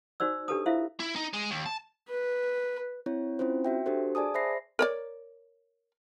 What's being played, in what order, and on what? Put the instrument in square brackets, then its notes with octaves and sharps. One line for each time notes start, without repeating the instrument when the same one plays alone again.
[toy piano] D#4 F#4 C5 D5 E6
D4 G4 A4 B4 A5 D#6
E4 F4 C5 E5 F5
[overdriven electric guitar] E4
D#4
G#3
D#2
A5
[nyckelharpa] B4
[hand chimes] C4 E4 C#5
C4 C#4 E4 F4 C5
F#4 E5 G5
D4 F#4 G4 A4 C5
G#4 D5 G#5 A5 D#6
C5 E5 B5 A#6 C7
[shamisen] A#4 C#5 D5